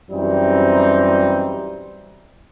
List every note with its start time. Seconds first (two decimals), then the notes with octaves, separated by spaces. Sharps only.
0.10 F#2 E3 G3 C4 D#4